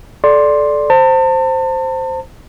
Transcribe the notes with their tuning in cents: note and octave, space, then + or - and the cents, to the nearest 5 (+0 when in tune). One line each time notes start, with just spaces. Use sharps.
A4 -20 D5 +0 C6 +10
C5 +0 A5 +35